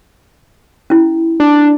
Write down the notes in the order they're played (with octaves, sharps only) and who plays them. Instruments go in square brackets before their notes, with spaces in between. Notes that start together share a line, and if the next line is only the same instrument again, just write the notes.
[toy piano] C#4 E4
[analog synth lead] D4